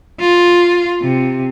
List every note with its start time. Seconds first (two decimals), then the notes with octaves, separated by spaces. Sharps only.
0.21 F4
1.02 C3